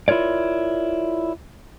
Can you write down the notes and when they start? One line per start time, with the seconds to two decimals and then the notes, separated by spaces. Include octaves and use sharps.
0.08 E4 F4 A#4 C#5 D5